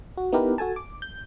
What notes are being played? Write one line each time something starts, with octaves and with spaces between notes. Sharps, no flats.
F#4
B3 D#4 E4 G4 A#4 B4
F#4 A4 G#5 A5
D6
G6